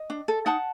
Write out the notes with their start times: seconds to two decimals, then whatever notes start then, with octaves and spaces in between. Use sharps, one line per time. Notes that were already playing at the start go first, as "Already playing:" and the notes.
Already playing: D#5
0.10 D4
0.28 A4
0.46 D#4 F#5 A5